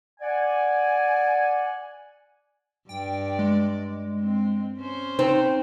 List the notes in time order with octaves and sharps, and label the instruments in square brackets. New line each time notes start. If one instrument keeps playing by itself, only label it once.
[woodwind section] D5 F#5 G#5
[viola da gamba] G2 D5 [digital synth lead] G5
[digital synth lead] G#3
[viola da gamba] C4
C#4 C5
[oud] C4 [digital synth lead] D#4